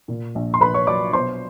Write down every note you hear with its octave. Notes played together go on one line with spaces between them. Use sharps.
A#2
A#1
C6
A#1 B4 B5
C#5 C#6
F#3 D5 D6
B2 C5 C6